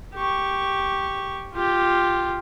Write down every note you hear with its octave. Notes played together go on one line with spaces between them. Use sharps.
G4 C#6
F4 G4